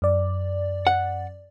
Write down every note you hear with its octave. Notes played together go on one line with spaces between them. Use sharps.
F#2 D5
F#5